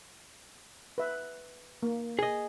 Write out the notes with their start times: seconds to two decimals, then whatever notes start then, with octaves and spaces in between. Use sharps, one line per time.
0.98 B4 E5
1.83 A#3
2.19 G#4 D#5